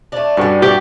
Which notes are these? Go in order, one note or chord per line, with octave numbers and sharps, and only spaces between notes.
A3 D4
G2 G3 C#4 F#4 A4
E3 G4 D5